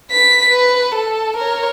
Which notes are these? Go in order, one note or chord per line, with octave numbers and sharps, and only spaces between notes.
B4 B6
B4
A4
A#4 C#5